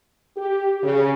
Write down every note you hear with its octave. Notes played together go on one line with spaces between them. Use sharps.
G4
C#3